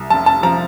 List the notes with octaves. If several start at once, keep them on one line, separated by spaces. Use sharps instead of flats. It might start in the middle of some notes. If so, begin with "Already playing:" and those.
Already playing: C2
F1 A5
A5
F3 A#5